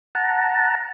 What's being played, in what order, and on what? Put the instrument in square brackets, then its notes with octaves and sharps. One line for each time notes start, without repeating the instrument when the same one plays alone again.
[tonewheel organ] F#5 A5 A#5